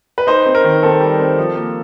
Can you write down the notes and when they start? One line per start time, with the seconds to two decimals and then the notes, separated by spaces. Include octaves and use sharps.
0.18 B4
0.27 D#4 C5
0.46 C4
0.55 A#4
0.64 D#3
0.83 C4 A4
1.00 G3
1.19 C4
1.38 F3
1.56 A#3